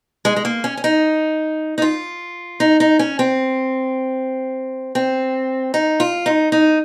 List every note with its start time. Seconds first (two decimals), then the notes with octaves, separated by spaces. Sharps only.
0.25 G#3
0.36 G#3
0.45 A#3
0.64 C#4
0.77 C#4
0.84 D#4
1.78 D#4
1.82 F4
2.60 D#4
2.80 D#4
2.99 C#4
3.19 C4
4.95 C4
5.74 D#4
6.00 F4
6.26 D#4
6.52 D#4